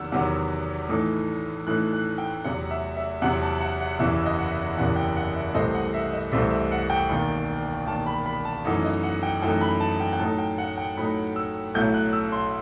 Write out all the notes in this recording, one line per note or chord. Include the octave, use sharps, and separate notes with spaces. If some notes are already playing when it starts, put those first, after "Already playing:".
Already playing: E2 C3 D#3 F#3 B3 F#5 E6
E2 C3 D#3 F#3 B3
A2 E3 A3 D#4
A2 E3 A3 D#4 F#6
F#6
G5
E2 C3 F#3 F#5
E5
E5
E2 C3 F#3 F#5
A5
F#5
F#5
F#1 E2 C3 E3 E5
D#5
F#5
E5
F#1 E2 C3 E3 F#5
G5
F#5
E5
C2 C3 E3 A3 C4 D#5
F#5
E5
D#5
C2 C3 E3 A3 C4 E5
E5
F#5
G5
E1 D#2 D#3
E1 D#2 D#3 A5
B5
B5
A5
F#2 E3 A3 D#4 F#5
D#5
F#5
G5
F#2 E3 A3 D#4 G5
B5
A5
G5
G5
A2 F#3 A3 D#4 A5
G5
F#5
G5
A2 F#3 A3 D#4 B5
E6
B1 A2 F#3 A3 E4 G6
F#6
E6
C6